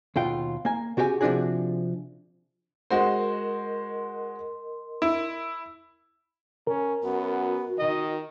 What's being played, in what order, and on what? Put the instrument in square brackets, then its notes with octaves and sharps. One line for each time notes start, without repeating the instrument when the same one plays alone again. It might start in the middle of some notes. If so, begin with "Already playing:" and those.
[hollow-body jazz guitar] D#2 B2 F4 G5
A#3 G#5
C#3 F#4 G4 C5 G#5
C3 F3 F#3 D4 F#4 G#4
[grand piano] G#3 F#4 C5 [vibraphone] A#4 D#5 C6
[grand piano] E4
[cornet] C#4 [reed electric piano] A#4
[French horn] F#2 [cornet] B3 [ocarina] F#4
[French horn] D#3 [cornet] D#5